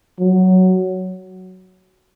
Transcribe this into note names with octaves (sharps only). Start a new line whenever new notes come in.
F#3